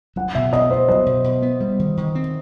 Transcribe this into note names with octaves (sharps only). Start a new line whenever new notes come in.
F#3 F#5
B2 E5
B2 D#5
B3 C5
F#3 D#5
B2
B2
B3
G3
D#3
D#3
C4